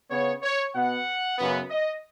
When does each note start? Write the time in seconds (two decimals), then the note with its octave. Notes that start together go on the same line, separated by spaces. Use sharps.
0.10 C#3 B3 C#5
0.43 C#5
0.74 B2 B3 F#5
1.38 F#2 C#3 B3
1.71 D#5